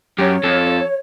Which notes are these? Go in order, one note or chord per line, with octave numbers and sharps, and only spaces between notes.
F#2 G4 C#5
F2 A4